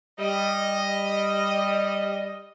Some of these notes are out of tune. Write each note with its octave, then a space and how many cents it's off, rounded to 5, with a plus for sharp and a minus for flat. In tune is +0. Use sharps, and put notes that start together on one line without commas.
G3 +15 D#5 +0